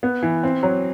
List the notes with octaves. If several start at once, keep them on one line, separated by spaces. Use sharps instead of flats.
B3
E3
C4
F#3